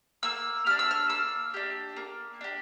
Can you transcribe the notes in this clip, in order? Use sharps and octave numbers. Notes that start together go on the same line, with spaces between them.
A#3 E6
D4 G4 F6
E6
F6
A#3 E6
D4 G4
A#3
D4 G4